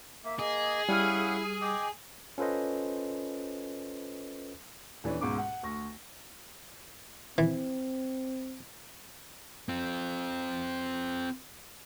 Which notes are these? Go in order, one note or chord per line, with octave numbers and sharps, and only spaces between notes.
A#3 E5
G#4 D#5
G3 C#4 E4 F5 F#5 F6
D#5 G5 D6
C#4 F4 A4 B4 C5 D#5
D#1 E3 D4 B4 C#5
C#2 G#2 B2 C#6 D6
F#5
D2 C#6 A#6
E3 C4
C4 F4